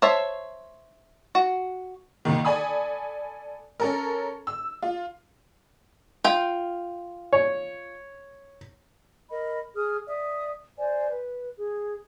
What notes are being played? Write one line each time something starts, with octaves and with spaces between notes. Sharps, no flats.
C5 C#5 E5 A5
F#4
C2 A#2 D#3
A4 D5 G#5 B5 D#6
C#4 A4 A#4
E6
F4
F4 G5
C#5
A#4 D#5 B5
G#4 D#6 F6
D5 E5 D#6
C5 D5 G#5
B4
G#4